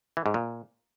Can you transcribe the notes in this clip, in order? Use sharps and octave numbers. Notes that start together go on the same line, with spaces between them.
E3
G#2
A#2